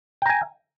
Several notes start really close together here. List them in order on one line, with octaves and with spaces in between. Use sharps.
G5 A#5 G#5